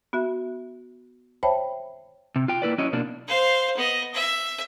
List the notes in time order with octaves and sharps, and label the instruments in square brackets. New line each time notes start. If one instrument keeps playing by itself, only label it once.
[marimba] B3 F#4 E5
C5 C#5 E5 G5 A5 B5
[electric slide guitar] C3
F4 G5
A#3 E4 B4 D5
F#3 C#4 E4 C#5 D#5
B2 A#3 D4
[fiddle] C5 F5
B3 D#5
E5